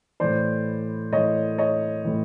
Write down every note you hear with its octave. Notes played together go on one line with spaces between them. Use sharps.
A2 E3 C5 D5
A2 E3 C#5 D#5
C#5 D#5
A2 E3